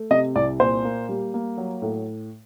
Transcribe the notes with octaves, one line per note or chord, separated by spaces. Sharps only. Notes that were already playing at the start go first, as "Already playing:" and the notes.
Already playing: A3
C3 D#5
C2 D5
A#2 C5
A#3
G3
A#3
F#3
A2